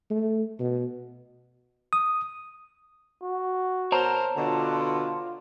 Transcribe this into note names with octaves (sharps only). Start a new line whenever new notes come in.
A3
B2
D#6
F#4
B2 A#4 C5 C#5 A5 A#5
B2 D3 F4